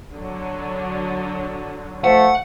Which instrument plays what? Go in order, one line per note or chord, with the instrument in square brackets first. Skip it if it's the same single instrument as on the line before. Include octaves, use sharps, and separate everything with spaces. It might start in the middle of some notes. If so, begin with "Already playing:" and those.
[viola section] D3 F#3
[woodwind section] F3 A3 [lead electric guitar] F#5